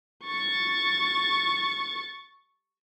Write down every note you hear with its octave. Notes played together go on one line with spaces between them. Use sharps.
C#6 A6